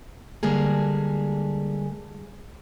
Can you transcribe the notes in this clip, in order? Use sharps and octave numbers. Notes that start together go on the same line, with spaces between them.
D3 G3 G#3 A#3 G#4